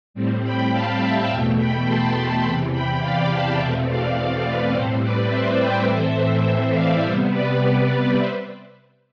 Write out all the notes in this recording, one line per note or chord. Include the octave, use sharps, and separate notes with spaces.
A2 G3 C4
G5 B5
F5 A5
E5 G5
E2 B2 A3 E5 G5
G5 B5
A5 C6
G5 B5
E2 C3 E3 G5 B5
G5 B5
D5 F5
F5 A5
E2 B2 A3 C4 E5 G5
D5 F5
D5 F5
B4 D5
A2 G3 C4 A4 C5
B4 D5
C5 E5
E5 G5
A2 E3 A3 C4 C5 E5
C5 E5
D5 F5
C3 G3 B3 C5 E5
B4 D5
B4 D5
C5 E5